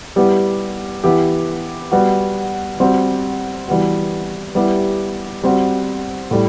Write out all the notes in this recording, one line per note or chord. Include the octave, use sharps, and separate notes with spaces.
G3 B3 E4 G4
E3 B3 E4 G4
G3 B3 F#4
G3 C4 F#4
E3 G3 B3 F#4
G3 B3 E4 G4
G3 C4 F#4
A2 G3